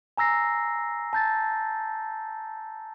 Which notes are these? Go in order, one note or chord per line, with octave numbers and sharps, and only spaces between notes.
G#5 A#5 E6 A#6 C7
A5 G6 A6